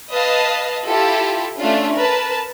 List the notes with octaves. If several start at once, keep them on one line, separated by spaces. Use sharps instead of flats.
B4 D#5 F5 A5
E4 F4 G4 A4
A3 C#4 D4 F4
A#4 B4 A5